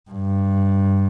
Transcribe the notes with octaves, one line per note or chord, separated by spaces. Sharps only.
G2